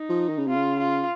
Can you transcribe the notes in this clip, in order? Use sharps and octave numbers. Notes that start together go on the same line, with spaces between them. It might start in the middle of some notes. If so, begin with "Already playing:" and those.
Already playing: D#4
F3
D#3
C#3
C3 F4
C#3
F4